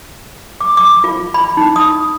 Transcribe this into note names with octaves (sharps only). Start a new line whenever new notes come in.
D6
D6
F4
B5
D#4
D#6